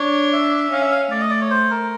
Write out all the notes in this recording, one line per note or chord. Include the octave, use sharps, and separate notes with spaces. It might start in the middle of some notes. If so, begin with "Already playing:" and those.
Already playing: D4 C#5
E5
C#4 F5
E5
F5
A3 D5
D#5
D5
C#5
C5
A#4